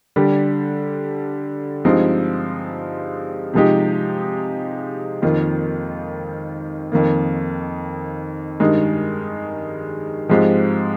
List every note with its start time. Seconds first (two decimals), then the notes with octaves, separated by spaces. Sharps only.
0.16 D3 G3 D4 G4
1.85 G2 F3 G#3 C4 D#4
3.54 C3 F3 G#3 D#4 G4
5.22 F2 D#3 A#3 F4
6.92 F2 D#3 A#3
8.60 G2 D#3 G#3 D#4 G#4
10.29 G#2 F3 G#3 C4 G4